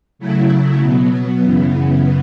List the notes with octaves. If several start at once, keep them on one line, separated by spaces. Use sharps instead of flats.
C#3 F#3 A3 E4
B2 F#3 B3
F#2 C#3 E3 B3